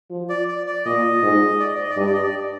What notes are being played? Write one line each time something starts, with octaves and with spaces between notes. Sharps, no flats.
F3
D5
D5
D5
A#2 D#5
G#2
D5
D#5
D5
D#5
D5
G2 D#5
D5
D#5
D5